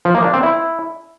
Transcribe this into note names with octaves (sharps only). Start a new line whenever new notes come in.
F3
A#3
D4
C4
E4